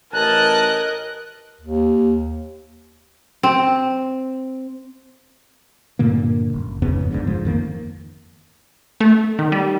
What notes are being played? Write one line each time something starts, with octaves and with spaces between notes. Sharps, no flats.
A1 A#4 D#5 G#5 A5 F#6
D#2
C4
G2 A#2 D3 A#3
F#1
F2 G#2 C#3 B3
F#1 B1 G#2 D3
G#2 F3
F2 D#3 A#3
A3
D#3
G3